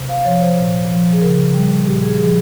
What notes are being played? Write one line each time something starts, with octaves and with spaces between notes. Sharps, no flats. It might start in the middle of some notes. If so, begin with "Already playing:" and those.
Already playing: C3
F5
F3 C#5
C5
A#2
F3
G#4
C#3 A#4
G3
A#2 G4
G#4
F3 G#4